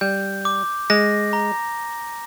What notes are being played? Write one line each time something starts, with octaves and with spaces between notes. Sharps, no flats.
G3 G6
D6
G#3 A#6
A#5